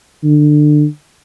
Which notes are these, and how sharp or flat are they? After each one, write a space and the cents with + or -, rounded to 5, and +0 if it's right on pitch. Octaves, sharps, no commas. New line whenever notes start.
D3 +25